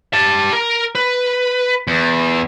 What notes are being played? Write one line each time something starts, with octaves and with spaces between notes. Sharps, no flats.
G4 A5
A#4
B4
E2